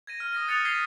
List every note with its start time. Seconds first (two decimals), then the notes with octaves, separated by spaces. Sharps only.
0.07 G#6 A#6 D#7
0.20 F6
0.32 D#6 A#6 D#7
0.47 D#6 F#6 A6 C#7 D#7 F7
0.65 G#6 B6 C7 D#7 F7 G7